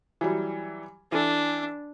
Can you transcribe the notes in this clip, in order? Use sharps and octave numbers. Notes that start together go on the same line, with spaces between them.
E3 F#3 G3
E3 D4 A4